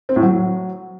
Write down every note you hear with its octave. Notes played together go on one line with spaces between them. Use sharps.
C4
A2
F#3